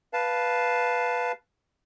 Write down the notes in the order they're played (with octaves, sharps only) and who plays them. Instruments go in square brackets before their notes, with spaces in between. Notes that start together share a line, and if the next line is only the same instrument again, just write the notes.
[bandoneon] B4 F5 A5